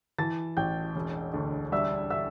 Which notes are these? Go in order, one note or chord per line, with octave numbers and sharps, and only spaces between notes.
E3 A5 A6
A1 G5 G6
E1
D2
G3 E5 E6
E5 E6